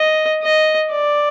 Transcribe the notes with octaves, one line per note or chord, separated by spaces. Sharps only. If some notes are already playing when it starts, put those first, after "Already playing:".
Already playing: D#5
D#5
D5